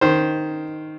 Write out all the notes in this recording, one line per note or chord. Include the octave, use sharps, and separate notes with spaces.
D#3 C5